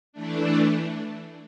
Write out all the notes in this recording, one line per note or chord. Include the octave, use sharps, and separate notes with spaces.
E3 A3 D4